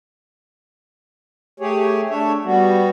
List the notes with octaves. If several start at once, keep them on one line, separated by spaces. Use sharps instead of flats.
A3 G4 G#4 C#5
A3 D4 C#5 E5
G3 B3 F#4